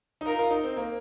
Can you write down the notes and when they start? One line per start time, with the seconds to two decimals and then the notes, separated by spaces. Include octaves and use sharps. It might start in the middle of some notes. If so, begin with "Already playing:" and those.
0.21 D#4
0.26 F4 A#4
0.39 F4
0.51 D#4
0.63 C4
0.76 A#3